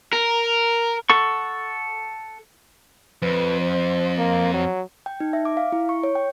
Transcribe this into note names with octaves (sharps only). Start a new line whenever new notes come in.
A#4
A4 F#5 C#6
F2 B4
C5
A#3
F#3
G5
D#4
E5
D6
F5
E4
C#6
C#5
G5